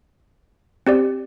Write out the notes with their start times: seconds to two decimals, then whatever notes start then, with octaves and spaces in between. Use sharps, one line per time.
0.87 C4 G4 D5